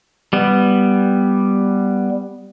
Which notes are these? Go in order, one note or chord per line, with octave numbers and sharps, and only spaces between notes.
G3 B3